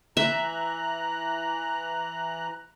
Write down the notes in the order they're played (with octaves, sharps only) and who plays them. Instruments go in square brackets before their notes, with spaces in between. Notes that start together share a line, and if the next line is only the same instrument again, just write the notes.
[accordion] E3 A#5 F#6 [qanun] E5